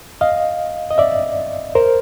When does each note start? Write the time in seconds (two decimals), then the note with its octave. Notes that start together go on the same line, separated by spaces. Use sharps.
0.21 D#5 F5
0.91 D#5
0.98 D5 E5
1.75 A#4 C5